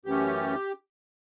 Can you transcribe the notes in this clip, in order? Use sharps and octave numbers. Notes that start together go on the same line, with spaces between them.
F#2 E3 A3 C#4 G4